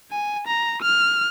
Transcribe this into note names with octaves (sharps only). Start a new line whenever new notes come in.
G#5
A#5
F6